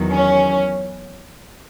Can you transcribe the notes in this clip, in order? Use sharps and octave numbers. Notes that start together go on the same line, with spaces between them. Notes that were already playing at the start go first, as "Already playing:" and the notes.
Already playing: E2 D#3 F#3
C#4